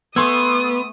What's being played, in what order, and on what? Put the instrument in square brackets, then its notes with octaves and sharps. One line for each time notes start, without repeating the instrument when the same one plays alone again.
[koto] A3 G#5 [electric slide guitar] B3 [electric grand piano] C6 E6 [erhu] D#6